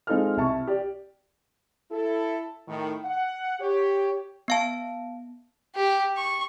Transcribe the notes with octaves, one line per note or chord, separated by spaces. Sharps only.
G#3 C4 D#4 F4 A4 F6
C2 E4 A5 C#6
G4 D5
E4 A4
A2 D#3
F#5
G4 C#5
B3 F5 A5
G4
C#6